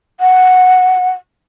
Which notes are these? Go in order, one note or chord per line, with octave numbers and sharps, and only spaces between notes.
F#5